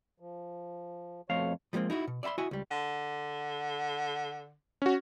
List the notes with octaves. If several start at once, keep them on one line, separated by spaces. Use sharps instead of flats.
F3
F2 B2 A3 C#5 F5
F3 G3 G#3 A#3 C4
D#4 E4 F#4
B2
D5 E5 F5 B5 C6
E4 F#4 D#5 E5 G#5
C#2 G3
D3
C#4 F#4